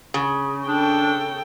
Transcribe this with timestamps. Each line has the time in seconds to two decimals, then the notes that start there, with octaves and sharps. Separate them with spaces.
0.14 C#3
0.68 D4 A4 G5